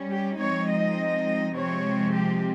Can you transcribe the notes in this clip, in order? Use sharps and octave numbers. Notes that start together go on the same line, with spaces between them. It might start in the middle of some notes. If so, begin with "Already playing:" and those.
Already playing: G3 C#4
G4
F3 G#3 C4 D#4 C#5
D#5
C3 F3 G#3 C4 C#5
G4